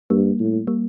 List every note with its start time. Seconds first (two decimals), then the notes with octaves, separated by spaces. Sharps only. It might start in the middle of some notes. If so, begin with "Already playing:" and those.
0.10 G2 G3 A#3
0.40 A2
0.67 G3 A#3